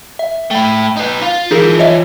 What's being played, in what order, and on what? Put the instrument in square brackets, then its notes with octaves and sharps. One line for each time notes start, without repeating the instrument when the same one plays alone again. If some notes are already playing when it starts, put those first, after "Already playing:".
[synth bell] E5
[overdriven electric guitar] A3 E4 [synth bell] G5
[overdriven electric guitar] D#4 B4
F4
[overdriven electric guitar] E3 F3 [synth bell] D#4 G#4 A#4
[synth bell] C#5 D#5 E5